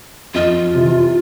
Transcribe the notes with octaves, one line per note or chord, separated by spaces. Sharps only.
F2 F4 D#5 F6
C3 E3